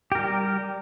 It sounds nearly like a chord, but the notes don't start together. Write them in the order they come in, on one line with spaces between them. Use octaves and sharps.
G4 A#4 G3